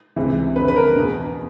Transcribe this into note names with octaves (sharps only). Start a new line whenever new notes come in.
C#2 C3 E3
F2 D3 B4
B4
A#4
E2 B2